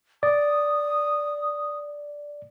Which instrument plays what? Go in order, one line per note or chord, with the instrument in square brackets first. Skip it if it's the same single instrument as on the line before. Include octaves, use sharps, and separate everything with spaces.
[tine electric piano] D5 [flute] D#6